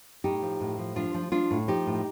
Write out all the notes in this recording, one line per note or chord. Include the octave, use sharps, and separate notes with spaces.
A2 D#4 G4
F3
A2
F3
F3 D4 F4
F3
F3 D4 F4
A2
F3 D#4 G4
A2